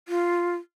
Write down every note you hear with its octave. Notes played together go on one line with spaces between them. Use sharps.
F4